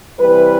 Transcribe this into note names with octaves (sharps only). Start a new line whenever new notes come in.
C3 E3 G3 B4